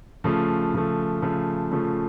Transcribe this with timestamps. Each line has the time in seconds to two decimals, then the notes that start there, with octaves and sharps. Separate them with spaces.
0.24 C#3 F3 A3
0.74 C#3 F3 A3
1.22 C#3 F3 A3
1.71 C#3 F3 A3